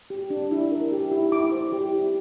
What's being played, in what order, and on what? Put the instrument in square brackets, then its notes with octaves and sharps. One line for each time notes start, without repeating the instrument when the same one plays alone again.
[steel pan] G4
D4
E4
A#4
G4
E4
E4 D6
C5
G4
E4